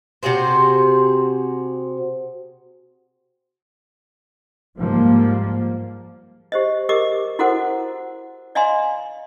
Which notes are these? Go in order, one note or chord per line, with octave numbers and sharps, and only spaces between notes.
C3 F#4 G#4 C5
G#2 F3 G3 A#3
G4 C5 D#5
G4 A#4 D#5 D6
E4 F#4 A4 A#4 C5 F#5
D5 D#5 F5 G#5 A#5 C6